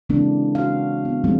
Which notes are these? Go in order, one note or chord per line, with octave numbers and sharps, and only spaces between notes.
C#3 E3 G#3 A#3 C4 D4
F#4 F5
B3
F3 G3 G#3 C4